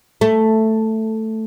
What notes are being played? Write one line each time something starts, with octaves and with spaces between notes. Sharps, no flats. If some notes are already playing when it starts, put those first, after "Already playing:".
A3